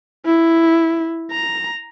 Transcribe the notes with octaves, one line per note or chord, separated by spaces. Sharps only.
E4
A#5